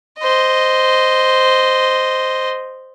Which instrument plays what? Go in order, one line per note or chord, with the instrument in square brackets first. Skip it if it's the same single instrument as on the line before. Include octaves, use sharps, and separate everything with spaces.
[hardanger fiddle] C5 D#5